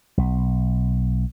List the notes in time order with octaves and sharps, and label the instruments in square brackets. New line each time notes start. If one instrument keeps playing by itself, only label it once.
[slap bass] B1